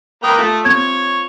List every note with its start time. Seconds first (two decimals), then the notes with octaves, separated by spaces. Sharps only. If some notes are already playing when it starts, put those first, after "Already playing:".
0.23 A#3 B4 G5 D#6
0.38 A3 F4
0.65 C4 C#5 G#6